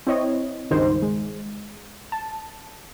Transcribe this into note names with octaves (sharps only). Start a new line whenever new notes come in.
C4 E4 C#5 D#5
C#2 G2 D#3 D#4 C5
G#3
A5